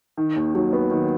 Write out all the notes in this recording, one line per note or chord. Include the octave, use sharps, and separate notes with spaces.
D#3
D#2
F#3
B3
D#3